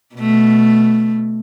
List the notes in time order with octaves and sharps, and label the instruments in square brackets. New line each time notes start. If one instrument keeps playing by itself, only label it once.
[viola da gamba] B2 A3